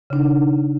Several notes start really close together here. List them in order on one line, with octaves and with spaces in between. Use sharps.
C#3 D4 D#4